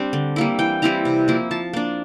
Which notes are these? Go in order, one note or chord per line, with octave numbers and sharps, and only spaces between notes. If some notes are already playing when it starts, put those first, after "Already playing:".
Already playing: G3 C4 D4
D3
G3 A#3 E4
E3 G5
G3 C4 E4 A#5
C3
F3 A#3 E4
F3 A5
A#3 D4